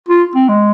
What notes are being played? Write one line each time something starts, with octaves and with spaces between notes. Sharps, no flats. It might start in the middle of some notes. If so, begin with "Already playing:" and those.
F4
C4
G#3